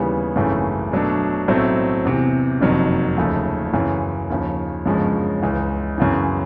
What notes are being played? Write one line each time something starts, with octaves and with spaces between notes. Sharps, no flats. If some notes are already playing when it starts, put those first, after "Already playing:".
Already playing: D#2 C#3 E3 G3 B3
G#1 F#2 C#3 E3 A3
B2 F#3 A3 D4
B1 A2 F#3 A3 C4
E2 C3 E3
F#1 F2 C3 D#3 F#3
D#2 C#3 F3 A3
F#2 C#3 E3
D#2 C#3 F3
G1 F#2 C#3 F3 G#3
C#2 C#3 E3
F#2 C#3 E3